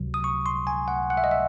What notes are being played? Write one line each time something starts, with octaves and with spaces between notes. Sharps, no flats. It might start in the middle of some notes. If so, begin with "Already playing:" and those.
Already playing: C#2 C3 F#3
D#6
C#6
C6
G#5
F#5
F#5
E5
D#5
E5